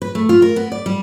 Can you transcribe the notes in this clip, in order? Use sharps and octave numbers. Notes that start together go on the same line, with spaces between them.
B4
A3
F4
A#4
B3
D5
G3